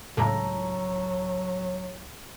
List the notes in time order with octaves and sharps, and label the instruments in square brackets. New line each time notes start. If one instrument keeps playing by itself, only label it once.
[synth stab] C#2 A2 [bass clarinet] F#3 [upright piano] A4 A#5